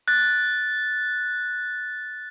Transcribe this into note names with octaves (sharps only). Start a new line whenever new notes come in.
F#6 A6